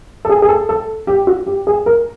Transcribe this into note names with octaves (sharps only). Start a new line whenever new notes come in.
A4
G#4
G#4
A4
A4
G4
F#4
G4
G#4
A#4